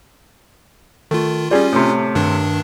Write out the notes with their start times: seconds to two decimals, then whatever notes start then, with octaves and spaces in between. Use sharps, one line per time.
1.11 D#3 A3 F4
1.51 G3 C#4 F4 G#4
1.72 A2 C3
2.15 G2 D#3 D4